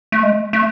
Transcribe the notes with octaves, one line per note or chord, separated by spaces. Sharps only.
A3
G#3
A3